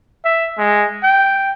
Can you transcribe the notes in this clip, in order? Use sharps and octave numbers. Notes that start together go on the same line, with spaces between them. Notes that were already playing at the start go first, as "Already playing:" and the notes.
E5
G#3
G5